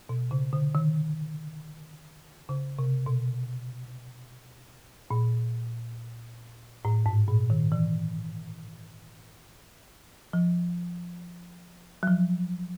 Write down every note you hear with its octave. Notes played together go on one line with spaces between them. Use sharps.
B2
C#3
D3
D#3
C#3
C3
B2
A#2
A2
G#2
A#2
D#3
E3
F3
F#3
F3